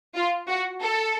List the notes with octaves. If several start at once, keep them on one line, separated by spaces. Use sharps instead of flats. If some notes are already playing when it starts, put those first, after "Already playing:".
F4
F#4
A4